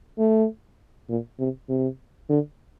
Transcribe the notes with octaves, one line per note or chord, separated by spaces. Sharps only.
A3
A#2
C3
C3
D3